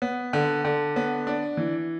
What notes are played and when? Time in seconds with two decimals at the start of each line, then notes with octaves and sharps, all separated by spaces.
0.02 B3
0.33 D3
0.65 D3
0.96 B3
1.27 D4
1.57 E3